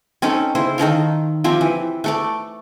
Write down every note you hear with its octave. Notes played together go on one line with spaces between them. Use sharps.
C4 C#4 D#4 A4
C#3 E4 C5
D#3 D#4 A4 F5
F3 C4 G4 E5
E3
A3 A4 D5